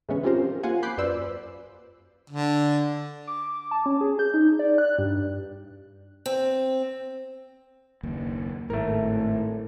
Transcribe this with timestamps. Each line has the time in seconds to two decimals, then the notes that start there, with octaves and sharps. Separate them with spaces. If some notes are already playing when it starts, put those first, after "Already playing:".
0.09 A2 C#3 E3 G#3 B3 C#4
0.23 C4 C#4 F4 G4 A#4 C5
0.43 F3
0.63 A#3 F4 F5 F#5 G#5
0.83 B5 D6 F#6 G6 C7
0.98 F#2 B4 C5 D5 E6
2.30 D3
3.27 D6
3.71 A5
3.86 C#4
4.01 G#4
4.19 G6
4.34 D#4
4.59 D5
4.78 F#6
4.98 G2
6.26 C4
8.03 F#1 D#2 A#3
8.70 G#1 A2 A3 A#4